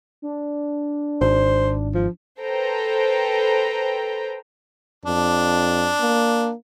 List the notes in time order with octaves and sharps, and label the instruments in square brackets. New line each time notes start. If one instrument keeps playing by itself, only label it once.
[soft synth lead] D4
[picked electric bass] G#1 [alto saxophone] C5
[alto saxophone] F3
[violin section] A4 B4 C5 G5 A#5
[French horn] F2 [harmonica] D4
[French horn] A#3